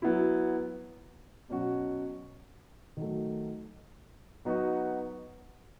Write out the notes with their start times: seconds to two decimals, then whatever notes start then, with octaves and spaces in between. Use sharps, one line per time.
0.02 F#3 B3 E4
1.49 B2 F#3 C#4 F#4
2.97 D#3 F#3 A3
4.45 F#3 B3 D#4 F#4